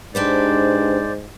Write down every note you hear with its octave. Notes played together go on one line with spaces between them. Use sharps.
G#2 D4 G4 B4 C5 D5